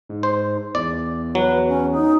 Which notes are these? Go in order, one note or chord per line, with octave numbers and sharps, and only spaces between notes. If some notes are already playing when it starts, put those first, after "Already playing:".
G#2
C5
E2 D5
F#3 B4
C#4
D#4